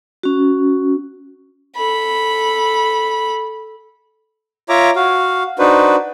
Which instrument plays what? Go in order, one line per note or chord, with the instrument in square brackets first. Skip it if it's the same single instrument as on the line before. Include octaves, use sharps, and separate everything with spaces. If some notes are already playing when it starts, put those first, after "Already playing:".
[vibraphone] C#4 F#4
[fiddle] A4 B5
[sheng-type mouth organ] F4 C#5 E5 A#5 D6
F#4 F5
D4 D#4 F#4 B4 C5